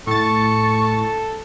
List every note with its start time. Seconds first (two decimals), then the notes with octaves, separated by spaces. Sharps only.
0.07 A2 A4 C#6 A6